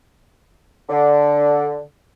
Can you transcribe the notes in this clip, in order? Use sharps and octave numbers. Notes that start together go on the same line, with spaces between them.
D3